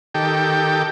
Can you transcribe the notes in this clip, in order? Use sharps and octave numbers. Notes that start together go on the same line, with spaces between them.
D#3 G4 A4 G5